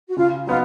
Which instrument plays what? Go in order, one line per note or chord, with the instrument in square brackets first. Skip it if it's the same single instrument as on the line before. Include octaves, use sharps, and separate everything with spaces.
[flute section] F#4
[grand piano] C#3 [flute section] F4
[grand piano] F#3 B3 D#4 [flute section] F4